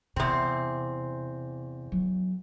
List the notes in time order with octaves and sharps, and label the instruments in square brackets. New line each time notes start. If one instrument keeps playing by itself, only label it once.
[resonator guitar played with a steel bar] E2 C4 [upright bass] C3
[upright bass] F#3